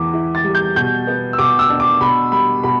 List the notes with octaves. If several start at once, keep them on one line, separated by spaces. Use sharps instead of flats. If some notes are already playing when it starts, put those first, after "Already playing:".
Already playing: E2 E3 D6
E4
A6
G3
G6
B2 G6
B3
E6
B2 D6
E6
D4
D6
B2 B5
G3 B5
B2 B5